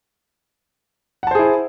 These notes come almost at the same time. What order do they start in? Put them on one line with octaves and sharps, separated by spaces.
F#5 A5 C5 G#4 E4